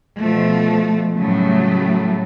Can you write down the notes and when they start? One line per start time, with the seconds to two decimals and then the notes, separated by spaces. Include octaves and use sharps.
0.19 B2 F3 A3
1.14 A2 C#3 F#3 G3 A3